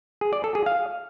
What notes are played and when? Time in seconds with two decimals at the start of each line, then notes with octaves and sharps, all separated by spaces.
0.21 G#4
0.33 D5
0.44 A4
0.55 G#4
0.66 F5